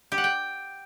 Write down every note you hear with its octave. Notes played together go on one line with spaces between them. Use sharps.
G4
F#5
G5